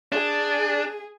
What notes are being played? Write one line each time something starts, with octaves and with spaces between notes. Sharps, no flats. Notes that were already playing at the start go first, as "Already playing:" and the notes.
D4 G#4